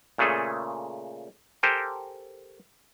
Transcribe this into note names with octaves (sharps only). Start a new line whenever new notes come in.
A#2 C#3 A3 G#4 A4
G4 A4 A#4 C5 G5 G#5